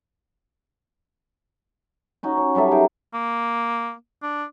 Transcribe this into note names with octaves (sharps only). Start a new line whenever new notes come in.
C#4 D#4 F#4
C#5
F#3 G3 A4 E5
D#4 G#4 A#4
A#3
D4